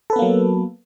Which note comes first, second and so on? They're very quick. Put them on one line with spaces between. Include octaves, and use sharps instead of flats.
A4 B4 B3 A#3 F#3